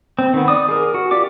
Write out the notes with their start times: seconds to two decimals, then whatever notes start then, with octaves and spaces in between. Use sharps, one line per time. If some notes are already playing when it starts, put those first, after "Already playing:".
0.19 C4
0.34 D#3 B3
0.48 D5 D#6
0.69 G#4 A#4
0.94 F#4
1.11 F4 G4 D5 D6